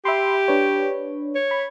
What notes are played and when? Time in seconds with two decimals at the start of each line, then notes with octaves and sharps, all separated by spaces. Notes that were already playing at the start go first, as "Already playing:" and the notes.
0.05 G4 E5 B5 C6
0.48 D4 B4 C#5
1.35 C#5
1.51 B5